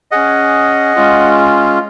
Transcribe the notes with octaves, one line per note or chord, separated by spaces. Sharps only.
C#4 G#4 D#5 F#5
G#3 C#4 F4